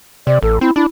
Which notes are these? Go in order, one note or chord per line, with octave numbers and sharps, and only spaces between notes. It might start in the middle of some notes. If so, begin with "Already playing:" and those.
C3 D5
A1 A4
C4 E4
D4 E4